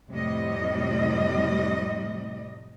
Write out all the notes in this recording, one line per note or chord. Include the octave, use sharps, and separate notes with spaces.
F2 A2 C3 G3 D#5